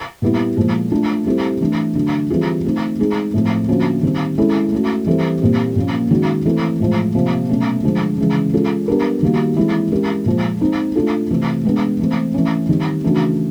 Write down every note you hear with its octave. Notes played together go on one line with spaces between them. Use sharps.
A#2 G3 B3 E4
A#2 F3 G#3
A3 D4 F4
G3 C4 E4 A4
E3 A3 D4
D3 F#3 A3 D4
E3 G3 C4 F4 G#4
A3 C4 D#4
G#3 C4 D#4 G#4
A2 F3 A3 C4
D3 F3 A#3 C#4 F#4
D#3 G3 C4
G#3 C#4 E4 A4
A3 C#4 F#4
E3 G3 C4 E4 A4
A#2 G3 C4
A#2 F3 A#3 C#4
D#3 G#3 C#4 F#4
E3 A3 C4 E4 A4
A2 F3 G#3
C3 F3 A#3
B2 F#3 A3 C#4
D3 F3 G#3
C#3 E3 G#3
G#3 C#4 F4 A4
G3 B3 D4 G4 A#4
D#3 G3 A#3 D#4 F#4
E3 G#3 C4 E4
G#3 C#4 E4 G4 A#4
A#2 F3 G#3
G#3 C4 D#4
A3 D4 F4 A4
C3 E3 A3
G#3 B3 D4
E3 A3 C4
E3 A3 C#4
D#3 G3 C4
C#3 E3 A3 D4 F#4